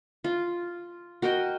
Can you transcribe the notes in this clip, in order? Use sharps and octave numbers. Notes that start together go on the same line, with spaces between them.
F4
F#4 A#4 D#5 G5